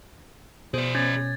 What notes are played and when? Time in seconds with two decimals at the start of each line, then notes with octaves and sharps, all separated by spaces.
0.74 B2 G#4 C5 D5
0.95 C#4 G#6 A6